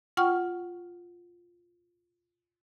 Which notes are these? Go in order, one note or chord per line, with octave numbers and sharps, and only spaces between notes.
F4 F#5 G5 C#6 F6